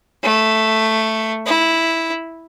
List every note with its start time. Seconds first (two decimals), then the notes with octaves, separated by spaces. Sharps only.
0.23 A3
1.46 E4